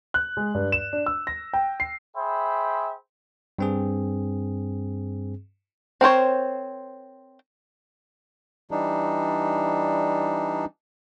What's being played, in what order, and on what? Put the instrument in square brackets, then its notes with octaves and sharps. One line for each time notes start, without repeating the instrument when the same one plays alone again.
[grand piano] F#6
G#3
G2
E7
D4
E6
A#6
G5
C7
[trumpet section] G#4 C5 E5 G5 B5
[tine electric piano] G2 C4 G#4
[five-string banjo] C4 A#4 C5 C#5
[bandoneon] E3 G3 D4 D#4